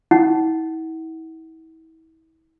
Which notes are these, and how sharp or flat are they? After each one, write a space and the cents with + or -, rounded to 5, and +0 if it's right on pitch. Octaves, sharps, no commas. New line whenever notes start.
E4 -40 F#5 +20